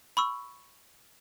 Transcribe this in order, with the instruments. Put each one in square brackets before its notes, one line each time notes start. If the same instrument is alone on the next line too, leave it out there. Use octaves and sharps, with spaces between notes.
[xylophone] B5 C#6 E6